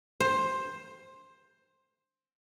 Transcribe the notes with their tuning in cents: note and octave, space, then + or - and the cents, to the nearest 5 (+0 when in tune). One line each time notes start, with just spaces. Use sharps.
C5 +10